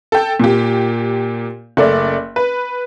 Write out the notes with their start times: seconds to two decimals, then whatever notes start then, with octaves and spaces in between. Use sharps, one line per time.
0.12 A4 G5
0.40 A#2 G4
1.77 F#1 A3 D5
2.36 B4